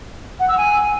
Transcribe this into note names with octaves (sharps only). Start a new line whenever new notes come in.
F#5
E6
G#5